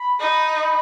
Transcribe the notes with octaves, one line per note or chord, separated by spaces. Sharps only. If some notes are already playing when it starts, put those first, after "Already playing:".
Already playing: B5
D#4